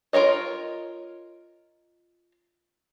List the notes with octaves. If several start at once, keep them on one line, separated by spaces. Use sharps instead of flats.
F4 A#4 C5 C#5 D#5